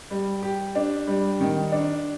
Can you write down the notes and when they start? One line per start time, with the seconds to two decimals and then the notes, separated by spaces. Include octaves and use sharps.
0.11 G3
0.42 G4
0.75 D4
1.07 G3
1.41 D#3
1.72 D4